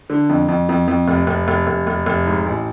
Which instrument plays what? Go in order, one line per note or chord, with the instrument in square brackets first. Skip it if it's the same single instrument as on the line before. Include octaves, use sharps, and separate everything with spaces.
[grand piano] D3
F2
F2
F2
F2
F1
F1
F1
F1
F1
F1
G#2
A1